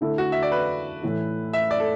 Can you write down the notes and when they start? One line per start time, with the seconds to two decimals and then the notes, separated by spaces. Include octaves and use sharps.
0.01 D3 A3 E4 A4
0.18 F#4
0.32 E5
0.43 D5
0.52 B4
1.03 A2 E3 A3 E4
1.53 E5
1.71 D5
1.80 A4